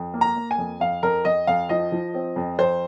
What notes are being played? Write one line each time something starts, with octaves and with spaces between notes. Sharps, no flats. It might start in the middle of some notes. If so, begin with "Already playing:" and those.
Already playing: F2
A#3
A#5
A#3
G#5
F2
F2 F5
F2 A#4
F2 D#5
F2 F5
F3 D#5
F3
C4
F2
F2 C5